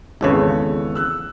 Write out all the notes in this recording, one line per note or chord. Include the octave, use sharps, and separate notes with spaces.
G#1 E2 C#3 A4 B4 C#5
E6 F#6